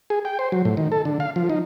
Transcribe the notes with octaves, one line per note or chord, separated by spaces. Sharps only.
G#4
G5
C5
F#3
A2
D#3
A4
D3
F5
F3
D#4